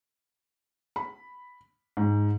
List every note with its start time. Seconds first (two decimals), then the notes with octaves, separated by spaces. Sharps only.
0.96 B5
1.97 G#2